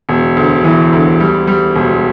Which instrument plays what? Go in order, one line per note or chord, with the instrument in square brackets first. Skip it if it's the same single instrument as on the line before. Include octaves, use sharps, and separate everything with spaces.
[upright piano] E1
D2
E3
D2
G3
G3
E1